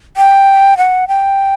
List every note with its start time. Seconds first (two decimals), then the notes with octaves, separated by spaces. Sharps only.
0.17 G5
0.78 F#5
1.08 G5